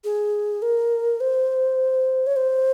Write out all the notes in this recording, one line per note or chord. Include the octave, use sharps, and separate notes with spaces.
G#4
A#4
C5
C#5
C5